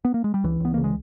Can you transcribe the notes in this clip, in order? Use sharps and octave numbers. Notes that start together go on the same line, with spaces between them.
B3
A#3
G#3
G3
C#2 E3
C#2 B3
C#3 A#3
G#3